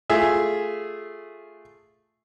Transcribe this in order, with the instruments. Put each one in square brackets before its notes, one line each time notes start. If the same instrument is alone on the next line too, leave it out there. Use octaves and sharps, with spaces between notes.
[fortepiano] A3 F4 G#4 E5